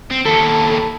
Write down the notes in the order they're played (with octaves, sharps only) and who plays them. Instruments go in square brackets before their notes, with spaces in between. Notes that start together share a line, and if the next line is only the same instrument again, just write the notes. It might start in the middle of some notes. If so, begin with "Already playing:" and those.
[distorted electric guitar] C4
[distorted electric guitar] D#2 E4 [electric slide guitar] A4